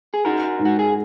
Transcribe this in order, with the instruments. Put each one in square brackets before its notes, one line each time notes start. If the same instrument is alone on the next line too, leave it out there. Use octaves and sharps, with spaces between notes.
[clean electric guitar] G#4
[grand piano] D#4 [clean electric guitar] F#4 A#4
[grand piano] G#2
[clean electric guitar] F#4
G#4